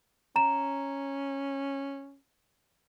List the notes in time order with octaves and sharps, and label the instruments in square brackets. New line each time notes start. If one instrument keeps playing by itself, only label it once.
[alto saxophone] C#4 [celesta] A#5 E7